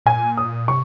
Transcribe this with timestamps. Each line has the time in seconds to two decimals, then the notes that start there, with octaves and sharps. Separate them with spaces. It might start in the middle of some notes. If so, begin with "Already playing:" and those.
0.06 A#2 G#5
0.37 D#6
0.68 C3 C#6